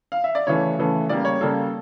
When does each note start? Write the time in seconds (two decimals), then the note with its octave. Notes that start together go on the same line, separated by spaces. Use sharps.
0.12 F5
0.24 E5
0.35 D5
0.47 C#3 E3 A3 C#5
0.79 C#3 E3 A3
1.09 C#3 G3 A#3 D5
1.25 C#5
1.41 C#3 G3 A#3 A4